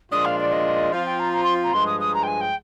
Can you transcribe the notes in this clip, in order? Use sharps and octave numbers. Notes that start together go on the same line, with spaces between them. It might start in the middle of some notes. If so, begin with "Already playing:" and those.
A#2 F3 G#3 D4 F4 D#6
F5
D5
D#5
F3 C4 F4 F5
G5
A#5
A#5
C6
A#5
G2 F3 G#3 C6
D#6
D#6
A#5
G5
G#5
G5